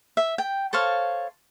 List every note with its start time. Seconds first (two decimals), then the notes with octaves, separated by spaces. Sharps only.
0.17 E5
0.38 G5
0.73 A4 C5 C#5 F5